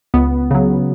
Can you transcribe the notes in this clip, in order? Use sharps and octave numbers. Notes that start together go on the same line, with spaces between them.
C#2 B3
C#3 F#3